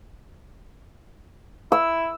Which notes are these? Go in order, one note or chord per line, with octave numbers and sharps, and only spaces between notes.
E4 E6